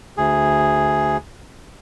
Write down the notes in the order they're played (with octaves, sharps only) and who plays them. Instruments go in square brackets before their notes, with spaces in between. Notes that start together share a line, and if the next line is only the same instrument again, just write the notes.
[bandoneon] D2 G#4